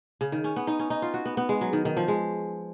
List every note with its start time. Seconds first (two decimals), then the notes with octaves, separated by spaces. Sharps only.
0.21 C#3
0.32 D#3
0.44 C#4
0.56 B3
0.67 D#4
0.79 C#4
0.90 D#4
1.02 F4
1.14 F#4
1.25 B3
1.37 B3
1.49 G#3
1.61 F#3
1.73 D#3
1.85 D#3
1.97 F3
2.08 G#3